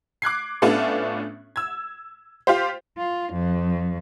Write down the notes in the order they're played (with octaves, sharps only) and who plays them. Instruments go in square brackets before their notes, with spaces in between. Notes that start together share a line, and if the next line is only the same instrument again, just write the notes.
[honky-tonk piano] D6 F#6 G#6 C7
A2 A3 B3 C#4 D4 F4
E6 G#6
F4 G4 C5
[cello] F4
F2